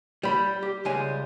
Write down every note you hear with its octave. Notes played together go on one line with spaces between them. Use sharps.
G3 B5
G4
C#2 G3 G#3 G#5